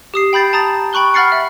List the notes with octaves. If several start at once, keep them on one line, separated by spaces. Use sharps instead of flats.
G4 D#6 C7
G5 B5 G6 A6 C7
A5 A#5 D#6 A6
G5 B5 C#6 F#6 G7
F#5 B5 F6 A6 C7 C#7
E5